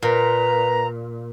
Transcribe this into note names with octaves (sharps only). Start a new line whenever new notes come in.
A#2 B4 A#5